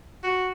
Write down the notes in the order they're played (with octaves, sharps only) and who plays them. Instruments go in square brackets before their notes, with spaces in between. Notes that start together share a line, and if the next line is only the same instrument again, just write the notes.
[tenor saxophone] F#4